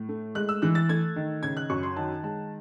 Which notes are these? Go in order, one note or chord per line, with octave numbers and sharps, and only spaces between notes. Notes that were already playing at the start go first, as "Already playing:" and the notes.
Already playing: A2
A3
G#3 F#6
E6
E3 F#6
A6
A3 G#6
D#3
C#3 G#6
F#6
F#2 C#6
C6
D#3 A5
G#3 A5